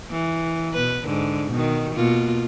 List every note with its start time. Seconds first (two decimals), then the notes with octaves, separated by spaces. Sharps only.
0.11 E3
0.74 B2 B4
1.05 G#2 D3
1.51 B2 D#3
1.95 B2 A#3 F4